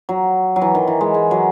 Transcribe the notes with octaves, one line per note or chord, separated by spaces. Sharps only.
F#3
F#3
E3
D#3
E3
G#3
G#3
F#3